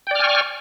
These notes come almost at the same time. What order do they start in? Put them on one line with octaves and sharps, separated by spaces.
G5 D5 F6 G#5 C#6